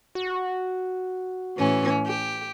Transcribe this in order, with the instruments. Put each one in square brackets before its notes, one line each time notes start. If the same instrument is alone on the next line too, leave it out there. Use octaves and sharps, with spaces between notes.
[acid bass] F#4
[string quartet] A2 E3 C#4
G4